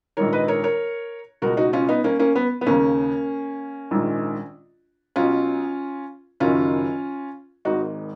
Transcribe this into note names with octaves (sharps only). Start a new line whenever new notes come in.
A#1 G#2 D#3 A#4 C#5
B4 D#5
A#4 C#5
A#4 C#5
C#2 B2 F#4 A#4
D#4 F#4
C#4 F4
B3 D#4
A#3 C#4
A#3 C#4
B3
B3
D#2 C#3 A#3 C#4
A#1 G#2 D#3
B1 B2 C#4 F4
F#1 F#2 D#3 C#4 F4
G#1 G#2 D#3 D#4 F#4